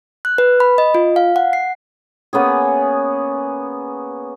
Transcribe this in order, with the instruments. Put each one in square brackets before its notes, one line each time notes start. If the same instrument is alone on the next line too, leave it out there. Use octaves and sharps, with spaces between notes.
[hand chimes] F#6
B4
B5
D#5
F4
F5
F#5
C7
[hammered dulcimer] A#3 B3 C#4 G#4